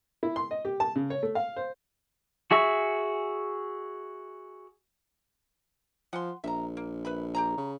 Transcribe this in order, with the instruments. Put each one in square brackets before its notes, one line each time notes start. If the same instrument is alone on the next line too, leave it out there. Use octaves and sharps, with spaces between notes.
[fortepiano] E4
C6
D#5
G4
A5
C#3
C#5
A3
F5
C5
[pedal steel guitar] F#4 G#4 E5 C#6
[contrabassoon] F3 [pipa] F#5 G#5 C6
[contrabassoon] A#1 [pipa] E5 A#5
[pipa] A#3
B4 E5 B5
G4 G#4 A#5
[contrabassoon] C#3